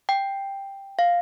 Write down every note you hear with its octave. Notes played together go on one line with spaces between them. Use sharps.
G5
F5